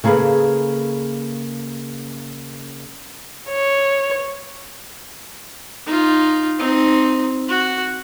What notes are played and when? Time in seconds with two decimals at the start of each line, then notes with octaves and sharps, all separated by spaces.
0.04 C#3 A#3 G#4 A4 B4
3.50 C#5
5.86 D#4 F4
6.58 C4 D#4
7.49 F#4